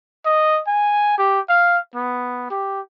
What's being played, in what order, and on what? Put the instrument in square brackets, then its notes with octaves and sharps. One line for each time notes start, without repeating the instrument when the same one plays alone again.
[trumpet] D#5
G#5
G4
F5
B3
G4